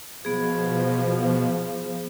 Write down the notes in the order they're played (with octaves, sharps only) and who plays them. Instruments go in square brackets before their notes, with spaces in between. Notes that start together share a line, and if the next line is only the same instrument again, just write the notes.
[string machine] B2 [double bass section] F3 [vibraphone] B3 G#4